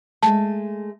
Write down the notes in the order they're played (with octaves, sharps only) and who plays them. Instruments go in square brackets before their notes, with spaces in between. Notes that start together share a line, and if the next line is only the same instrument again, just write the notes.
[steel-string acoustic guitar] G#3 A3 [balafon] A5